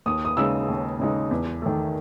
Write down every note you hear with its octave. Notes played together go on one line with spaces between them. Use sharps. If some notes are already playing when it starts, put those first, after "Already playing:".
D#2 D#6
D#6
C#3 G#3 D#4 E6
D#2
C#3 G#3 D#4
E2
D#3 A3